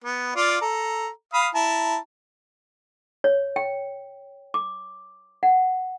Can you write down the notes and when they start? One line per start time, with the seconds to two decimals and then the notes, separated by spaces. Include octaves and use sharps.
0.04 B3
0.36 F4 D5 F5
0.61 A4 A#5
1.34 F5 B5 D#6
1.54 E4 A5 A#5
3.24 C#5
3.56 G5
4.54 D6
5.43 F#5